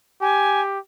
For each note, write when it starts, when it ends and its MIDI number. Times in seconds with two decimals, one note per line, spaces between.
0.22 0.79 67
0.22 0.61 80